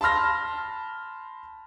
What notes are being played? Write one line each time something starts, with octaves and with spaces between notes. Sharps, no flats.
A5 B5 C6 F6 A#6